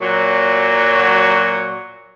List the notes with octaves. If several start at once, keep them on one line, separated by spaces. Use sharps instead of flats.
A#2 F#3